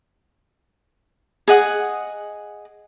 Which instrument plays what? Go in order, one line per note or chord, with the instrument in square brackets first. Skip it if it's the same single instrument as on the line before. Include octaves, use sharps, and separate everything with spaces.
[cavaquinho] G#4 D#5 F#5 D#6